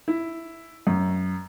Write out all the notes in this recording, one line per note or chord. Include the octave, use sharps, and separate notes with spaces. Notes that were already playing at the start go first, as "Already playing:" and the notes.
E4
F#2